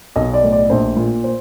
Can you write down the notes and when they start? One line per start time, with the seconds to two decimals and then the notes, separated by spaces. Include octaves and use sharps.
0.16 B1 D#5
0.33 D5
0.43 A2
0.52 D5
0.70 A#1 C5
0.97 A#2
1.24 C5